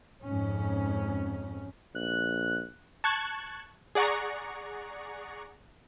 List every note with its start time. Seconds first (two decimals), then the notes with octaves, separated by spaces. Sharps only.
0.23 F2 G#2 C#4
1.95 A#1 F#6
3.04 A5 C#6 F#6 G#6
3.95 G#4 D5 F#5 A#5 C#6